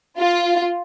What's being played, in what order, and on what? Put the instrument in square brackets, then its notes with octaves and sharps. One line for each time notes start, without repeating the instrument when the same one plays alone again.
[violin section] F4